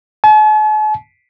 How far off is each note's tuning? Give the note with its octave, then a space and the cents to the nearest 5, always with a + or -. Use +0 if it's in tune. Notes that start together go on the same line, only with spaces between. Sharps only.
A5 -45